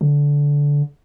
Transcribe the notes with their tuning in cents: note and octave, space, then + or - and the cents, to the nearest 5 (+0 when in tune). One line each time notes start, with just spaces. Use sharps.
D3 -20